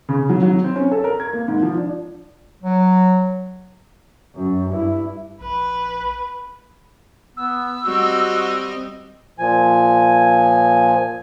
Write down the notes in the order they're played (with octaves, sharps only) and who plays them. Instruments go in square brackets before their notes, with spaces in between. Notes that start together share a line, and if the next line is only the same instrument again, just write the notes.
[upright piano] C#3
F#3
F#3
C4
C#4
A4
A#4
G#6
A#3
G#2
F3
D4
[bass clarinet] F#3
[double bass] F#2
G2 E4
[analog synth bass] A#1 [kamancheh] B4
[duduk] B3 [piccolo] E6
[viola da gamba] G3 C4 D#5 [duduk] F#4
[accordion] A#2 F3 G#5